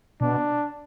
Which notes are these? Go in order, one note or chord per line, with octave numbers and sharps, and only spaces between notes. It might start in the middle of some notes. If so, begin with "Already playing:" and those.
B2 D4